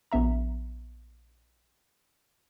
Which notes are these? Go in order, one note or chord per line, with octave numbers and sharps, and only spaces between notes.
A#1 B3 E5 A#5